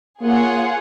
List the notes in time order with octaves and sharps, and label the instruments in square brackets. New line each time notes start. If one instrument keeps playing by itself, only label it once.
[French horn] A#3 [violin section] F4 G#4 C#5 F#5